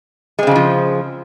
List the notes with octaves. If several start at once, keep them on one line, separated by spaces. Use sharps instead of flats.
C#3 F3 F#3 G#3 C4